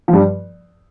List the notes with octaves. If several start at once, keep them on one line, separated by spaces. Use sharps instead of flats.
F3
G2 G3